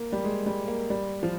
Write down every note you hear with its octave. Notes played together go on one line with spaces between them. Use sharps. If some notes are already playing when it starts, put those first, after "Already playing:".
Already playing: A#3
G3
G#3
G3
A#3
G3
F3